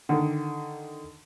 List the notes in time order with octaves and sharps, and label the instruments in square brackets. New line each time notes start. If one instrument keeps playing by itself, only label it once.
[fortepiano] D3 D#3